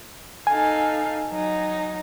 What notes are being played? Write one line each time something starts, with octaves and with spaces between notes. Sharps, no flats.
D#4 A4 F5 G#5
F#3 D#4